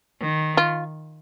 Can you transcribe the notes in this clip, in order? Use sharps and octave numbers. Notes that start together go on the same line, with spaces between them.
D#3
F4